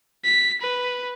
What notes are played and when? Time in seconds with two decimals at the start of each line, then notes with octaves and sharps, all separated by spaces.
0.25 B6
0.62 B4